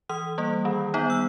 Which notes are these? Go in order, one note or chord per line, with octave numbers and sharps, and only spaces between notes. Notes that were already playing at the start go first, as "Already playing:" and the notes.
E3 D#6
G3 A#3
D#3
G3 B3 D#4
E6